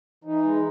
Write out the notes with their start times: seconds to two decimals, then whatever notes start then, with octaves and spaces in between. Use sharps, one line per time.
0.24 E3 D#4
0.43 G#3